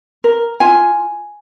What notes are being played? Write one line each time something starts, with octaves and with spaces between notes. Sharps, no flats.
A#4
F4 G#5